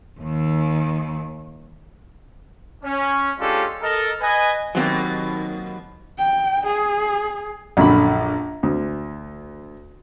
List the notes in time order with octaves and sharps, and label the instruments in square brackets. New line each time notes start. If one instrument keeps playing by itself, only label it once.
[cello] D#2 D#3
[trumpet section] C#4
G#3 C#4 D4 F4 G4 A4
A4 A#4 D#5
B4 D#5 G#5
[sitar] D#2 B2 A#3 [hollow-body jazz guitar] F#3 C4
[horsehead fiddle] G5
G#4
[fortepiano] A#1 F#2 D3 B5
D2